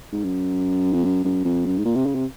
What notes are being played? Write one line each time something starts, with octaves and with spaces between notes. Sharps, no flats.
G#2
F#2
F2
F#2
F#2
F2
F#2
G#2
A#2
C3
C#3
C3